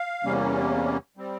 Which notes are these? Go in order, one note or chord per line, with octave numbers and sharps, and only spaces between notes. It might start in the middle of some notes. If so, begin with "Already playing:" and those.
Already playing: F5
E2 C3 G3 A#3 C#4
G3 C4